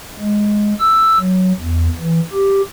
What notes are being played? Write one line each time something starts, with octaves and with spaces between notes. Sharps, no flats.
G#3
E6
F#3
E2
E3
G4